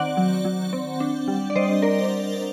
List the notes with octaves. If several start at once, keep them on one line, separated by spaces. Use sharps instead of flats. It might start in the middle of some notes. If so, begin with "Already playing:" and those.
Already playing: D#3 C4 D5 F#5
F#3
F#3
C4
D4
G3
D5
G3 C5 D#5
D4 A#4 D5